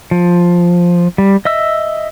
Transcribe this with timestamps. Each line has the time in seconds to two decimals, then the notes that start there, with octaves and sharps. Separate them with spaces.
0.11 F3
1.18 G3
1.45 D#5 E5 E6